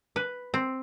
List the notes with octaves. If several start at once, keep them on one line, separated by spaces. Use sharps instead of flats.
B4
C4